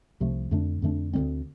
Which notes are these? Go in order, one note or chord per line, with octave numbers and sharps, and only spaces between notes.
C2 C3 F3 A3
F2 D3 A3 D4
F2 D3 A3 D4
D2 D3 G3 C4